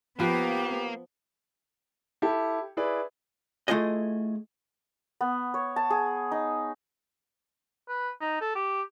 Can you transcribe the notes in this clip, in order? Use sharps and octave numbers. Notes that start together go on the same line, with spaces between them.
F3 A#3 B3 G4 B4
E4 G4 A4
E4 G#4 B4 D5
A3 E4 F4 G#4 D#5
B3
C#5
A5
G#4
D#4
B4
D#4
A4
G4